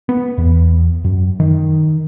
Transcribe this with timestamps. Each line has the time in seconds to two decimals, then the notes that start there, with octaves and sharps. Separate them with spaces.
0.09 B3
0.38 E2
1.04 F#2
1.40 D#3